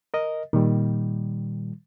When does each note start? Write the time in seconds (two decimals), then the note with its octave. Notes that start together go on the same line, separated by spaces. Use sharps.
0.14 A#4 D#5
0.53 A#2 D#3 G3